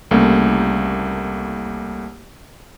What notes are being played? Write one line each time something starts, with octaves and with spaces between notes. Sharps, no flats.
C2 C#3 A3 A#3